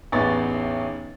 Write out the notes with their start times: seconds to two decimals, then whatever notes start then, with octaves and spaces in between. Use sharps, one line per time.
0.12 A1 E2 B3 D#4 C#6 A6